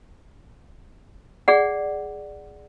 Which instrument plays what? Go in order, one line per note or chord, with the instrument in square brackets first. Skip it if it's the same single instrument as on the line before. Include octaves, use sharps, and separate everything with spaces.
[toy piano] G#4 D5 F#5